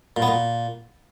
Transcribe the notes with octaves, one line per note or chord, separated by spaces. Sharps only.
A#2
B3
A#2